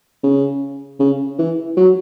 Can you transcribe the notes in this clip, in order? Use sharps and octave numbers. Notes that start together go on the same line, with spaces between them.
C#3
C#3
E3
F#3